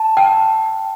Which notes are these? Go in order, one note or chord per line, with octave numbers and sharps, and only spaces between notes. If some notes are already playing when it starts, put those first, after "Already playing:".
Already playing: A5
G5